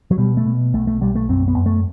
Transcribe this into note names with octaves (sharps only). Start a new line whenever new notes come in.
F#3
B2 G3
A3
B2
B1 A3
A3
B1 G3
A3
F#2 C4
B3
F#2
A3